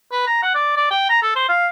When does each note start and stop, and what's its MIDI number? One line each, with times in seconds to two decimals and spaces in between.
0.11 0.23 71
0.27 0.40 82
0.42 0.53 78
0.55 0.72 74
0.76 0.90 74
0.91 1.07 79
1.10 1.20 82
1.22 1.35 69
1.35 1.46 72
1.49 1.69 77